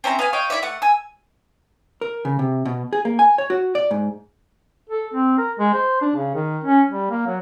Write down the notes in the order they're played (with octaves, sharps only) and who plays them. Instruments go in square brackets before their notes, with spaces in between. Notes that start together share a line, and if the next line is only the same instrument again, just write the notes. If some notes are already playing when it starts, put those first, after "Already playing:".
[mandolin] C4 C#4 E4 A#5
B3 F5 G#5
C#5 D#5 F5 G5
E4 C#5 D5 E5
A3 F#5
G#5 E6
[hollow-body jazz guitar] A#4
C#3
C3
B2
G#4
A#3
G#5
C#5
F#4
D5
G#2
[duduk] A4
C4
A#4
G#3
C5
D4
C#3
D#3
C#4
G3
A#3
F#3